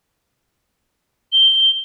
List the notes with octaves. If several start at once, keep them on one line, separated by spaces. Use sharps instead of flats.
G7